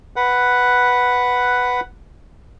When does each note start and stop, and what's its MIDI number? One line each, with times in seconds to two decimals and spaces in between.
0.16 1.80 71
0.16 1.80 78